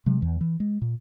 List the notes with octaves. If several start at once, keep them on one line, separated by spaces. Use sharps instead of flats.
C3 F#3 G#3
E2 E3
E3
G#3
A#2